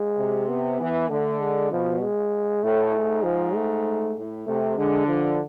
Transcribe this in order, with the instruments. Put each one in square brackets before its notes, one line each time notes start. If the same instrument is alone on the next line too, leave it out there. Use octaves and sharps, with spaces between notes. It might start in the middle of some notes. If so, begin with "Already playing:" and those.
Already playing: [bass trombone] G#3
[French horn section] C3
[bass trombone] B3
[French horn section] E3
[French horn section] D3 [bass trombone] A3
[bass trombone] G#3
[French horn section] B2 [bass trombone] F3
[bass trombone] G#3
[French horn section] A2 [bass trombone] A3
[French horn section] G#2
[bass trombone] F3
A3
[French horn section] A2
[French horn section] C3 [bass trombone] A3
[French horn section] D3 [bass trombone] G#3
[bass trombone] F3